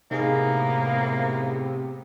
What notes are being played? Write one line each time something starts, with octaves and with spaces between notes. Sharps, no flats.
A2 C3 A#3 B3 D#4 G#4